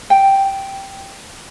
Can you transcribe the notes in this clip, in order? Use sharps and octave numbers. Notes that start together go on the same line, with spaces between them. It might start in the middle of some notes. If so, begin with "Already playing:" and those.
G5